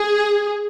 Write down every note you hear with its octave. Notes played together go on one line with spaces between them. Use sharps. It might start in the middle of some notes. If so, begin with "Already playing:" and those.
Already playing: G#4